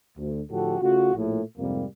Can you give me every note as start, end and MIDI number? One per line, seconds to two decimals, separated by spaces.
0.18 0.41 38
0.51 0.78 45
0.51 0.78 50
0.51 0.78 53
0.51 0.78 66
0.51 0.78 67
0.51 0.78 69
0.80 1.13 49
0.80 1.13 57
0.80 1.13 65
0.80 1.13 66
1.15 1.42 34
1.15 1.42 45
1.58 1.84 41
1.58 1.84 44
1.58 1.84 48
1.58 1.84 55
1.58 1.84 58